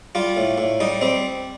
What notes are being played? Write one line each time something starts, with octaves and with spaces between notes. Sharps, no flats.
G3 F4
A2
A2
G3 D#4
G3 C4